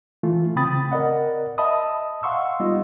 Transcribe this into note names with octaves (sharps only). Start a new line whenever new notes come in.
E3 A3 F4
C#3 C4 G5 B5 D#6 A6
A#4 D5 D#5 F#5
D#5 E5 A5 B5 D#6
F5 F#5 C6 C#6 E6
G3 B3 D#4 F4 D#5